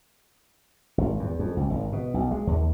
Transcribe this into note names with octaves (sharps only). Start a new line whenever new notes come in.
G#1
E2
F2
C#2
G#1
B2
B1
G#3
D#2